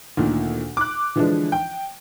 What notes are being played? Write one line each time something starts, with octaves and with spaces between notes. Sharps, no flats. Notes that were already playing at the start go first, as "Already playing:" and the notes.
D2 A#2 D#3
D6 F#6
D3 E3 F3 G#3 D4
G5